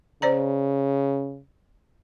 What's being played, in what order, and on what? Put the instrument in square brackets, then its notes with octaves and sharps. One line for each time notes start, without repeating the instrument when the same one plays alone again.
[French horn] C#3 [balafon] C5 D5 A#5